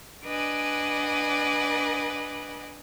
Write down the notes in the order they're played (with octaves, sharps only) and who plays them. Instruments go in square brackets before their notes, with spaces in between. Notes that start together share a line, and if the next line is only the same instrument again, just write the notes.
[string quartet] D4 B4 D5 D#5 F#5 G#5